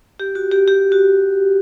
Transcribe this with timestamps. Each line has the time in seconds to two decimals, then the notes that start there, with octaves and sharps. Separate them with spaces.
0.20 G4
0.35 F#4
0.51 G4
0.67 G4
0.92 F#4